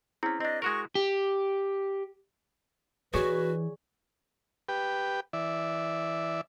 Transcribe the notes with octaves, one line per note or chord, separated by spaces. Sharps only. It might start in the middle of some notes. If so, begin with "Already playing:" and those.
C4 C#4 E4 G#4
C4 D4 D#5
G#3 F#4 A#4 C#6
G4
E3 F#4 G#4 B4 C#5 D5
G4 B4 G5
E3 D5 E5